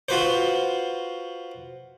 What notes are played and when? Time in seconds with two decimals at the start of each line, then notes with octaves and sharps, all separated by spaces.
0.09 F4 F#4 B4 C5